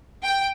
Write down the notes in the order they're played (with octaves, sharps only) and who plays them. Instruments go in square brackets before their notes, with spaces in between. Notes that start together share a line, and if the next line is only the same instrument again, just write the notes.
[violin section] G5